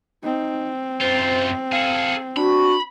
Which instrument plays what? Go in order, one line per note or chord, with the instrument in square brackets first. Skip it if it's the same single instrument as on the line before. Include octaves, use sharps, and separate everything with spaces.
[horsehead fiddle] C4 [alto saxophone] D#4
[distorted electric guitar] F#2 F4 [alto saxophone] C5
[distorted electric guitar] G#4 A4 [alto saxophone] F5
[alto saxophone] D4 [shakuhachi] F#4 [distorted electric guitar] B5